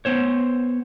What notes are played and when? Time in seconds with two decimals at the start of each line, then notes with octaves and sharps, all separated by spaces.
0.05 B3 C5 C#5